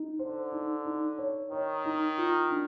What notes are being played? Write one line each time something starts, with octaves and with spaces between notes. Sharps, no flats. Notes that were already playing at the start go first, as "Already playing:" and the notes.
Already playing: D#4
D3 C5
D#4
D#4
C#5
D#3 C#5
D#4
F4
D4